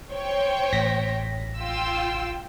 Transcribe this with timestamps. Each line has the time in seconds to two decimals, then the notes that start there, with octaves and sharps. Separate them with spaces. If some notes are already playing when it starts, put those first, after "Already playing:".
0.11 C5 C#5 G5
0.73 A1 A#6 B6
1.58 F4 G5 E6